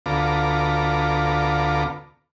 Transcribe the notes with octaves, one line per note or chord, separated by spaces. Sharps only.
D2 B3 F4 A4 A#5 D6